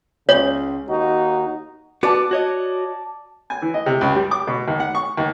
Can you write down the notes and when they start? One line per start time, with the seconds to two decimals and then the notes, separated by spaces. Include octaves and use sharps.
0.29 C#2 C#3 C#5
0.89 D#2 D#4 F#4
2.03 B3 F#4 D5 A5
2.31 F#4 C#5 D#5
3.50 G#5
3.62 E3
3.74 D#5
3.86 C3
4.01 C#2
4.15 G3
4.31 D6
4.47 B2
4.68 D#2
4.80 F#5
4.95 C#6
5.17 D#2